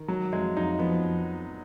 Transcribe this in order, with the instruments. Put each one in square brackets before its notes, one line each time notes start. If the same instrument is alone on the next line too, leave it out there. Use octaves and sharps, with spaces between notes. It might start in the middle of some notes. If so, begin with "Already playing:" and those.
Already playing: [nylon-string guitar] D#3
[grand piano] F#3 [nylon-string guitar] D#4
[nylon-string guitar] F2 [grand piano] G#3
[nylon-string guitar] F2 [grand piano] D#4
[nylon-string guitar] F3 [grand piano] B3
[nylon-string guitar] F2